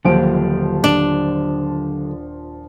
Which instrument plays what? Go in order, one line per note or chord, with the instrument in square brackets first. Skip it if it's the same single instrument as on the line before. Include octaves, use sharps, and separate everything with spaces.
[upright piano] D#1 F3 D7 [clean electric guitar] D3 F#3 G4
[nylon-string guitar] D4